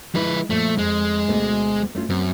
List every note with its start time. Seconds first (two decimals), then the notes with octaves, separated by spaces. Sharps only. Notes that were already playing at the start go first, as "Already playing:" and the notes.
0.15 F3 G#3 E4 B4
0.50 A#2 F3 A3
0.78 F2 G#3
1.28 D2 B2 A3
1.95 A3 C#4 F4
2.10 F#2 C4